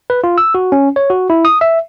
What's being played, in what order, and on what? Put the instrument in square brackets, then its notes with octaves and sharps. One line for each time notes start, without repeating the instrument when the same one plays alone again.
[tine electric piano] B4
F4
E6
F#4
C#4
C#5
F#4
E4
D#6
E5